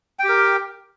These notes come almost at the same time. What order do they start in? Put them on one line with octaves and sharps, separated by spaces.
G5 G4 A#4